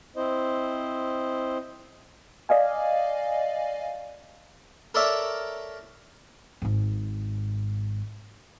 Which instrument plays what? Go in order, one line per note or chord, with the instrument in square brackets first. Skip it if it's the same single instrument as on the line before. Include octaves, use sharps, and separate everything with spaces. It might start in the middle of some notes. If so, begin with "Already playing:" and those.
[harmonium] C4 E4 C5 D#5
[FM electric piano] D5 D#5 F5 G#5
[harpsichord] A4 A#4 C#5 D5 E5
[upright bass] G#1 G#2